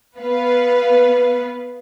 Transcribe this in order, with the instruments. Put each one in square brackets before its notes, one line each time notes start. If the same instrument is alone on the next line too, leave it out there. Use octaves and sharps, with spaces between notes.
[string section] B3 B4 F5